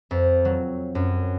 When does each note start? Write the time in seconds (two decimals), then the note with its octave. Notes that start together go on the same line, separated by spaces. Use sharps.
0.11 F2
0.45 F#3
0.95 F#2